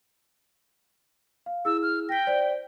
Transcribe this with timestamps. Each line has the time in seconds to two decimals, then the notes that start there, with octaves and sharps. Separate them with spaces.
1.46 F5
1.65 E4 G#4 E6
1.83 F6
2.09 G5 A#6 B6
2.27 C5 D5